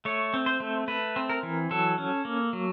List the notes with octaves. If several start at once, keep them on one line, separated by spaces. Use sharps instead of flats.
A3 C#5
C4
C5
A3
A3 B4
C4
A#4
E3
F#3 A4
C#4
A#3
F#3